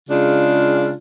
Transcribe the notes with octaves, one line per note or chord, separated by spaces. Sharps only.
C#3 G#3 D4 F4